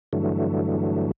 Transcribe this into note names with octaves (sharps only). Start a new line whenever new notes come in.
G2 D3 E3 F#3 A3